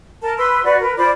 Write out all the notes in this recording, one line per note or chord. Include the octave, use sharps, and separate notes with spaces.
A#4 A5
B4 C6 E6
F#4 B4 D5
A#4 B4
F4 C5 D5 B5